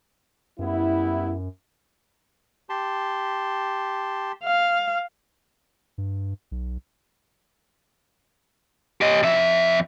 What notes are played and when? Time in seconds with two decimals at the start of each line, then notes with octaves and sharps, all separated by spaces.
0.59 F#2 G3 B3 E4
2.69 G4 A5 C6
4.44 F5
5.98 G2
6.51 B1
9.01 G4 D#5
9.23 F2 E5